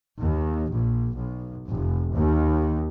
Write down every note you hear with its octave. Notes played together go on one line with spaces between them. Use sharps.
D#2
A#1
B1
F1
D#2